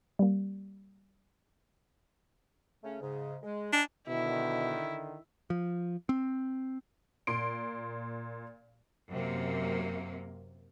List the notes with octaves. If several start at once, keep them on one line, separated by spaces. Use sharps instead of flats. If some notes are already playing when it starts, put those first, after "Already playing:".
G3 A#3
C#3 A3 C#4
G#2 C#3
G#3
D4 D#4 G#5
B2 D3 D#3 E4
F3
C4
A#2 C6 D7
F#2 C3 A#3